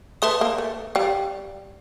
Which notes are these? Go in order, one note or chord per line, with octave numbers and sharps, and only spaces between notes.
A3 B4 E5 A5 C6 D#6
A#3
A3
G3 F5